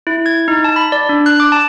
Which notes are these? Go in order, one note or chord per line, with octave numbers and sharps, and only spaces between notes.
E4
G#6
D#4
A5
B5
D5
D4
F#6
D6
A5